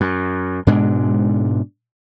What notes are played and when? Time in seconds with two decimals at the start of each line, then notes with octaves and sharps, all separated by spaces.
0.01 F#2
0.67 G#2 B2 G#3 D4